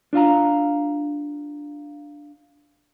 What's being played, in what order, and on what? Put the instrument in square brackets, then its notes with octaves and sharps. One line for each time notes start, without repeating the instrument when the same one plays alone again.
[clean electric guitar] D4 F4 F5 A#5